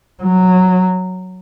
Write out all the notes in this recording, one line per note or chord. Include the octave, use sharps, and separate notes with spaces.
F#3